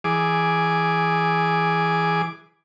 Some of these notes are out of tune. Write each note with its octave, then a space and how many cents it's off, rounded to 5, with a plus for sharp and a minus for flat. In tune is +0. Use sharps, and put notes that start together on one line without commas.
E3 +0 G#4 +0 D6 +0